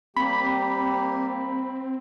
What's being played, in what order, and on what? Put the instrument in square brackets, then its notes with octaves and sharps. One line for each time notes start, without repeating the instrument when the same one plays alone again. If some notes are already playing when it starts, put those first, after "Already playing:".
[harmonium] G3 A#3 G4 [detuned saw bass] C4 [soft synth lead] B5